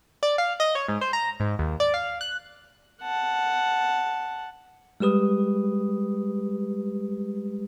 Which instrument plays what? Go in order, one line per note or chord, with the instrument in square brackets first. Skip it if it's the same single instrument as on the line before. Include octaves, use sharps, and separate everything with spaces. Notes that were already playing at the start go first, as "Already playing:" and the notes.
[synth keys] D5
F5
D#5
C#5
G#2
C5
A#5
G#2
D#2
D5
F5
F#6
[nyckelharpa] F#5 A5
[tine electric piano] G3 G#3 G4 B4 D#6